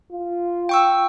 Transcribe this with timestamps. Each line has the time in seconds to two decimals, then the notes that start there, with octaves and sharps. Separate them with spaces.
0.11 F4
0.69 G5 C#6 E6